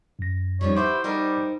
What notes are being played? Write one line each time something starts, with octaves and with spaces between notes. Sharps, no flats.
F#2 A#6
F2 D#3 F3 G3 C#4 C#5
E4 G4 B4 C5 F#5 C#6 D6
G3 D#4 A#4 C5